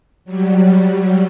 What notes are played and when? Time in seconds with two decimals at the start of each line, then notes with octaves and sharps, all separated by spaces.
0.25 F#3 G3